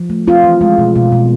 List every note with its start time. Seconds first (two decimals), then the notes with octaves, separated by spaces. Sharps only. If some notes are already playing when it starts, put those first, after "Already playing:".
Already playing: F3
0.10 A3
0.27 C4 F4
0.44 E3
0.61 G#3
0.78 B2
0.96 B2
1.12 B2